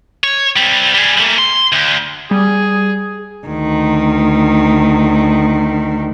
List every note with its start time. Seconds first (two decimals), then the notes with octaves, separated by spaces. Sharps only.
0.24 C#5
0.56 G3 C4
0.94 G3 G#4
1.20 A3 A#3
1.38 C6
1.72 D2
2.31 G3 G#4
3.47 D2 D#3